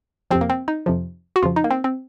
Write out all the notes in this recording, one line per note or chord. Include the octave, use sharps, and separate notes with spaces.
F2 C3 F3 C4
A#3
C4
D#4
F2 C3 F3
F#4
F2 C#3 F3 F4
D#4
A#3
C4
C4